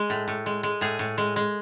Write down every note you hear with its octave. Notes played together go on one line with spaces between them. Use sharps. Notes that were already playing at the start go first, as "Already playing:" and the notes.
Already playing: G#3
A2
A2
G#3
G#3
A2 G#4
A2
G#3
G#3